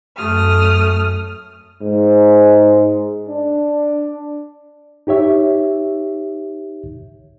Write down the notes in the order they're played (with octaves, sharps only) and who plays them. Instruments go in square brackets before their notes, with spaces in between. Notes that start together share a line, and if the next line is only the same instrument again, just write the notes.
[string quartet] F#2 A3 D#6 F6
[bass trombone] G#2
D4
[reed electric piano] D#4 G4 C#5 E5